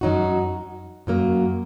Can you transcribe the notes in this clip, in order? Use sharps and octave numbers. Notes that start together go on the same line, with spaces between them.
F#2 F#3 D#4 F#4
F#2 F#3 A#3